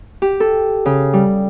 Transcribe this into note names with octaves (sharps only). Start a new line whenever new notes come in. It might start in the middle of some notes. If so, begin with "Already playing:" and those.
G4
A4
C#3
G3